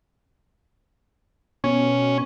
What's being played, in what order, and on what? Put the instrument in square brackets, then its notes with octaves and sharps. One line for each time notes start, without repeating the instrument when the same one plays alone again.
[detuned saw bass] B2 [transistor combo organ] C#4